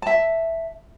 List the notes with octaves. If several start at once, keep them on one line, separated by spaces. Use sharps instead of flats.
E5 A5